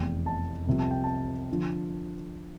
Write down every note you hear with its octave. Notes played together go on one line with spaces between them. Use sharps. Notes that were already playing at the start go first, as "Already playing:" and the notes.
Already playing: F1 E2 E3 G5
A5
C2 C3 F3
A5
G5
A5
D3 F3